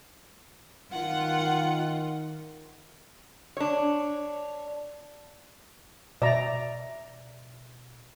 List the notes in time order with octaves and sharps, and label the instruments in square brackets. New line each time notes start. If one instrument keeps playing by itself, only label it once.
[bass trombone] D#3 [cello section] F4 [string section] F#5
[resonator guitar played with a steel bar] D4 C#5
[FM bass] B2 [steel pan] D5 A#5 [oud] E5